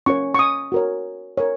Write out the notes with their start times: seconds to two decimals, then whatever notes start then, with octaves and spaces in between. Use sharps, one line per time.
0.06 C#4 F4 A#4 C#5 C#6
0.34 C#6
0.39 D#6
0.72 F#4 A#4 C#5
1.37 A#4 C#5